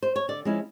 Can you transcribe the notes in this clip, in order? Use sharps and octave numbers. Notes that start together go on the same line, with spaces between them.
C5
C#5
D3 D5
F3 G#3 C#4 E4